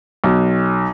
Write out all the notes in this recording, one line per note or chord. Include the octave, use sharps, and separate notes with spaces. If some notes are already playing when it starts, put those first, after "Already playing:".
B1